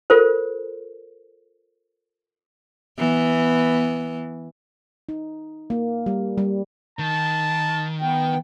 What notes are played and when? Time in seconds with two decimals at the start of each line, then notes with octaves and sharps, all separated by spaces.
0.10 F4 A4 A#4 C5
2.98 E3 B3
5.09 D#4
5.70 A#3
6.06 G3
6.38 G3
6.99 D#3 A5
8.01 B3 G5